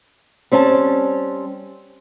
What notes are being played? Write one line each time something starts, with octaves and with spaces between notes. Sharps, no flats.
G3 C4 C#4 G#5 A5